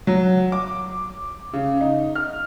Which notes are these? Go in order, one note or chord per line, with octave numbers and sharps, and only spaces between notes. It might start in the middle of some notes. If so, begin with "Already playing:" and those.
F#3
D6
C#3
D#4
F6